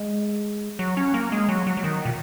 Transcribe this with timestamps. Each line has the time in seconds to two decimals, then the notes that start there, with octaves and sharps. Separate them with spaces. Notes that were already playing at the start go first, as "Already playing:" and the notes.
Already playing: G#3
0.79 F#3
0.97 C#4
1.14 A#3
1.32 G#3
1.49 F#3
1.67 F#3
1.77 F#3
1.84 D#3
2.05 A#2